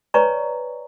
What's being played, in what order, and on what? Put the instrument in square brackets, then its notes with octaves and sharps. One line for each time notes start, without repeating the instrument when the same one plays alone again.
[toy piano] B4 C#5 D5 G#5 A#5 C#6